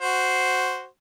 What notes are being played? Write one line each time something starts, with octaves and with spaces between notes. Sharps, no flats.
F#4 C5